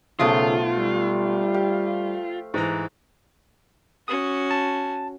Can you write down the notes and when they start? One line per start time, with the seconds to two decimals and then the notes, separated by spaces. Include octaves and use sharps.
0.19 B1 C#3 F3 A3 F4 D#6
0.78 G3
1.54 G4 F5
2.54 G#2 E3 A#5
4.08 C#4 F#4 D#6
4.51 A5